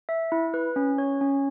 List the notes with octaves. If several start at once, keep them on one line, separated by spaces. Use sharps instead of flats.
E5
E4
B4
C#4
C#5
C#4